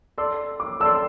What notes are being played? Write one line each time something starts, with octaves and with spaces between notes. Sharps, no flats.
A4 D5 C6 E6
D6
A4 D5 C6 E6